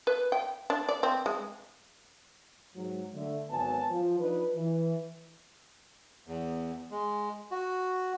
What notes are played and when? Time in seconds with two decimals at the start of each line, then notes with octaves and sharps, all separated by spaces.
0.07 B4
0.32 G5
0.70 D4
0.89 D5
1.03 C4
1.26 G#3
2.75 G#2 F#3
3.14 D3 A3
3.50 G#1 F#3 B3 G#5 A5
3.90 F3
4.19 F3 D4 D#4 B4
4.56 E3
6.27 E2
6.91 G#3
7.51 F#4